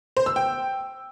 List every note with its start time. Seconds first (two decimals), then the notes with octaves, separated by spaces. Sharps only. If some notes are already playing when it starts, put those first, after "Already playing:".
0.17 C5
0.26 E6
0.36 G5